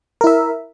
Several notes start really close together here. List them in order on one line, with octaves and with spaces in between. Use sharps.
A#4 E4 E5